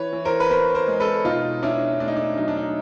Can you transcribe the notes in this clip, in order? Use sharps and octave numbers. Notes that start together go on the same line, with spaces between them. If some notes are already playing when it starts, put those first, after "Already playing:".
Already playing: E3 B4 C#5
E3
A#4 C5
B4
B3 A#4 C5
A#4 C5
G#3
A4 B4
B2 D#4 F4
C#4 D4 E4
A3 D4
D#4
D4
F#3 D#4
D4
D#4